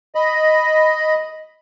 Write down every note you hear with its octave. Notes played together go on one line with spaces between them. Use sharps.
D#5 B5